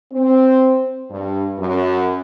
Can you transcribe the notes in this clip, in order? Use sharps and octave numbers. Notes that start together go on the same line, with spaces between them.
C4
G2
F#2